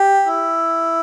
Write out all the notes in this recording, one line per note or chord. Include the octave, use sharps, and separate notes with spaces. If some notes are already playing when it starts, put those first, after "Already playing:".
Already playing: G4
E4